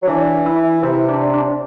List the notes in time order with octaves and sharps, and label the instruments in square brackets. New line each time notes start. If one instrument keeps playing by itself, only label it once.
[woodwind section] F#3
[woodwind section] E3 [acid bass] D4
[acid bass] E4
[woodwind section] C3 [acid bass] E4
[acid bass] D4
D4